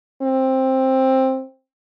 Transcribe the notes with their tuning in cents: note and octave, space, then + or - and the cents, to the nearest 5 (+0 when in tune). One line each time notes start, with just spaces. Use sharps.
C4 +10